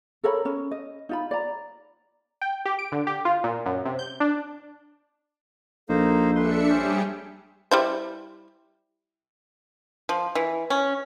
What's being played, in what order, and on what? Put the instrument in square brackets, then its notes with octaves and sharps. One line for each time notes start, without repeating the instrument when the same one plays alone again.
[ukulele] A4 A#4 C#5 B5
C#4
D#5
D#4 F4 B5
D5 A#5
[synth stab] G5
G4
D7
D3
G4
F4
A#2
F#2
C3
G6
D4
[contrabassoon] A#1 [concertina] A#3 D#4 C5 [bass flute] A4
[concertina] G#3 B4 C6 [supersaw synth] D4 E5 C#7
[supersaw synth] G3 G4 G#4 [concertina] C#4 C5
[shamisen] G3 E4 C5
[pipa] F3
E3
C#4